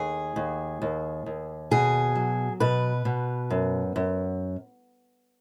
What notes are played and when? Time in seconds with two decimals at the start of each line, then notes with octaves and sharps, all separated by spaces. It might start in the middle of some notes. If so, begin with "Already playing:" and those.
Already playing: D#2 G#4
0.36 D#2
0.82 D#2
1.26 D#2
1.71 B2 G#4
2.15 F#3
2.60 B2 B4
3.05 B2
3.50 F#2
3.96 F#2